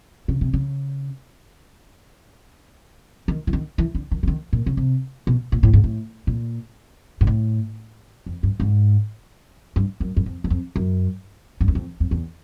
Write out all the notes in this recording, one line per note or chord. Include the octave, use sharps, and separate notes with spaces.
C#3
C3
C#3
D#3
E3
D#3
E3
D3
D#3
E3
D#3
A#2
C#3
C3
B2
A#2
A2
G#2
A2
A#2
G#2
A2
F2
G2
G#2
G2
F#2
F#2
F2
E2
F2
F#2
G2
F#2
F2
F2
E2